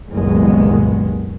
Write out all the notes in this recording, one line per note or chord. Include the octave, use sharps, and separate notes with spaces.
F#1 C2 A#2 D#3 G#3 B3